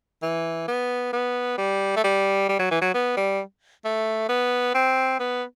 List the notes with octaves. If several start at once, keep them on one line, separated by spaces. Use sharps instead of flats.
E3
B3
B3
G3
A3
G3
G3
F#3
E3
F#3
B3
G3
A3
B3
C4
B3